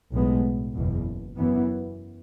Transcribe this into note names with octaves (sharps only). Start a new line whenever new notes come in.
B1 A2 G#3 B3
F#1 E2 B2
F#2 E3 B3